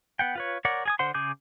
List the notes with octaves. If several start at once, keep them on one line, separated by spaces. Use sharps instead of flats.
B3 F#5 G5
F4 B4 C#5
A#4 C#5 D5 F#5
G#4 G#5 D#6
D3 C5 F#5 C6
C#3 G#4 D6 G6